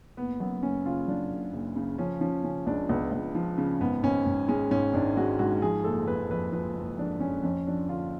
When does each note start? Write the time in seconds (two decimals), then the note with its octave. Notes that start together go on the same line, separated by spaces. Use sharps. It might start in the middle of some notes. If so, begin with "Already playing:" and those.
0.17 F#1 B3
0.40 F#2 B3
0.63 F#1 C#4
0.85 C#3 F4
1.07 F#2 D4
1.31 F#1
1.53 F#1
1.76 C#3
1.98 F3 C#4
2.21 F3 C#4
2.44 C#3 C#4
2.66 C#2 D4
2.89 C#2 B3
3.12 C#2
3.35 F3
3.58 C#3
3.81 G#1 B3
4.03 G#1 C#4
4.26 G#1
4.48 G#3 C#4
4.71 G#2 C#4
4.93 G#1 D4
5.17 G#3 F#4
5.39 G#2 F#4
5.62 F3 G#4
5.84 F#1 A4
6.07 F2 B4
6.31 F2 B4
6.52 F3 B4
6.76 F#1
6.98 F2 D4
7.20 F2 C#4
7.43 F2 C#4
7.67 F3 D4
7.89 D3 F4